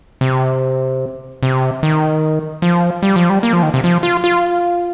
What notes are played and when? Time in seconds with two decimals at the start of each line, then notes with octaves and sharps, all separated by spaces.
0.21 C3
1.43 C3
1.83 D#3
2.62 F3
3.02 G3
3.16 F3
3.30 G3
3.43 A#3
3.53 F3
3.63 D#3
3.74 C3
3.84 F3
4.03 F4
4.24 F4